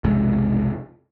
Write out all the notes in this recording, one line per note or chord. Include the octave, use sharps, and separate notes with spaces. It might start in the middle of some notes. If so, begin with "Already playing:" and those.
B1 F2 C3 G#3